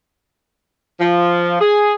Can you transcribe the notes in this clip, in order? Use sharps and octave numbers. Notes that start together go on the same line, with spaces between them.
F3
G#4